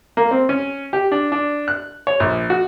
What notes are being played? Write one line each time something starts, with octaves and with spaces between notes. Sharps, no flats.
A#3
C4
C#4
G4
D4
D4
F#6
C#5
A#1
F#4